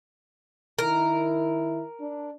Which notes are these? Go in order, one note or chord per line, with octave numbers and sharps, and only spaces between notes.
D#3 E4 A#4
D4